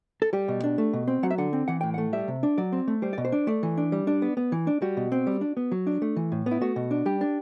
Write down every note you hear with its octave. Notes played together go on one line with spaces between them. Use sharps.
A4
G3 G4
B2
D4
A3
B2
C4
F#3 F#5
E5
D3 F#5
C4
E3 F#5
A2 G5
A3 F#5
G3 E5
C3
D4
F#3 D5
C4
A3
G3 C5
B2 D5
C5
D4
A3 D5
E3
D4
G3
D4
B3
B3
E3
D4
G3 F#4
B2
C4
G3
D4
B3
F#3
D4
A3
E3
A2
B3
E4
A3 F#4
B2
D4
G3 G4
D4